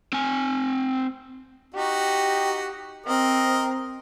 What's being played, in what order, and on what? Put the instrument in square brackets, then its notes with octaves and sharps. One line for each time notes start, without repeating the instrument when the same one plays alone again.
[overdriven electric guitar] C4 G#5
[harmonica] D#4 F#4 [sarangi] G4
[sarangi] C4 [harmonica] A#4 D#5